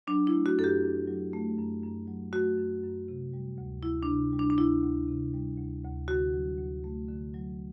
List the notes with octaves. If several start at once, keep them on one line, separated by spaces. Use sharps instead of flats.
F#3 D4
E4
A3
F#4
F#2 A4
G4
F#2
F#3
A3
F#2
F#2
F#3
A3 F#4
F#2
F#2
C3
G3
D2
D2 E4
D4
C3
G3
D4
D4
D2 E4
D2
C3
G3
D2
D2
D3 F#4
F#3
D2
A3
D3
F#3